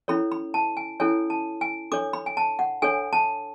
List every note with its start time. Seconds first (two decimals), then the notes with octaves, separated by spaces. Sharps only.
0.08 C#4 E4 A4 C#5 B5
0.32 B5
0.54 A5
0.77 G#5
1.00 C#4 E4 A4 C#5 G#5
1.30 A5
1.61 G#5
1.92 D4 A4 C#5 D6
2.13 B5
2.26 G#5
2.37 A5
2.59 F#5
2.82 D4 A4 C#5 G#5
3.13 A5